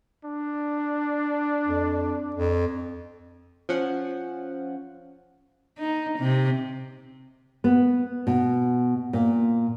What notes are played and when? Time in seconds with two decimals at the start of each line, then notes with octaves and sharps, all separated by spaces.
0.25 D4
1.67 F2
2.35 F2
3.69 F3 C#4 F#5
5.78 D#4
6.18 C3
7.64 B3
8.27 B2
9.13 A#2